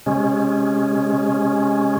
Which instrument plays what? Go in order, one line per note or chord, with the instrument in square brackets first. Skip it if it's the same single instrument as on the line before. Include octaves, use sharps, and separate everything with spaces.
[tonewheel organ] C3 G#3 C#4